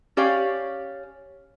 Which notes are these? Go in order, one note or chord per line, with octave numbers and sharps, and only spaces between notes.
C#4 G4 C#5 D5 F5